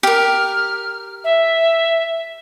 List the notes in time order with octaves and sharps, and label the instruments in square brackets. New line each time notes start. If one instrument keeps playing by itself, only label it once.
[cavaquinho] G4 A#4 [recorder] F6
[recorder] E5